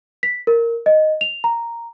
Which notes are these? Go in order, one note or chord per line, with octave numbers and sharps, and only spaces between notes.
B6
A#4
D#5
F7
A#5